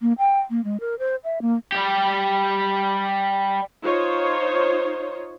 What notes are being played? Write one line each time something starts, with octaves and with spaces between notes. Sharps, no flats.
A#3
G5
A#3
G#3
A#4
C5
E5
A#3
G3 G4
D#4 F4 C5 C#5